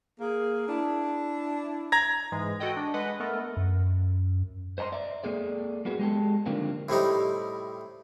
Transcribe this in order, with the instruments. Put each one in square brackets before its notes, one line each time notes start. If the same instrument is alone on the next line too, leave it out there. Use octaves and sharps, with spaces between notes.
[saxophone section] A#3 G#4
D4 E4
[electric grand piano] A#5 G#6 A#6
[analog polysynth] G#2 E3 G#3
F#4 A4 D#5 G5
D4
G#3 B4 D#5 F#5
A3 B3 A4 A#4
[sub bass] F#2
[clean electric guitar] C5 D#5 A5 A#5 C6
D5 E5
A#3 G#4 A4 D5
A#3 B3 F#4 G#4
G#3 G4 A4
D3 D#3 F3 G3 A#3 C4
[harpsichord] A2 C3 G3 D#4